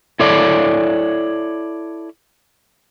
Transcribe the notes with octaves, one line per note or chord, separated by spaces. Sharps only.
E4 A4 C#5 D5